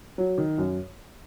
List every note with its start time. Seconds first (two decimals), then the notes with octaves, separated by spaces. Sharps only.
0.18 F#3
0.38 D#3
0.58 F#2